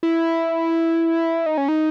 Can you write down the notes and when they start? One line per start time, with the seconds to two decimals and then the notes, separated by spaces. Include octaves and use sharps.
0.03 E4
1.46 D#4
1.58 C#4
1.68 D#4